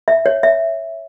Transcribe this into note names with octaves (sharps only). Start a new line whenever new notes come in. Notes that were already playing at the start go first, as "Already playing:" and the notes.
E5
C#5
E5